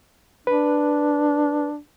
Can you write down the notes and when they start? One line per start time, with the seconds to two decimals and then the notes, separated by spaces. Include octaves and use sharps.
0.47 D4 B4